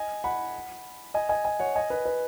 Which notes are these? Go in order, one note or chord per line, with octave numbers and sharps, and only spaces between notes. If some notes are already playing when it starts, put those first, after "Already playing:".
Already playing: D#5 G#5
F#5 B5
D#5 G#5
D#5 G#5
D#5 G#5
C#5 F#5
D#5 G#5
B4
B4